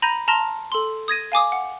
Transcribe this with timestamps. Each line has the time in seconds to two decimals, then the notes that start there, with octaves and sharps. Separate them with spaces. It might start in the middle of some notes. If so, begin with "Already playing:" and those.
0.02 A#5 B5 G6 A#6 D#7
0.28 A5 A#5 C6 F6 A#6
0.72 A4 C6
1.08 D#6 G#6 A#6 D#7
1.32 F5 G#5 D6 D#6
1.52 F#5